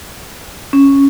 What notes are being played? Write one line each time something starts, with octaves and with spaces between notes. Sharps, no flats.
C#4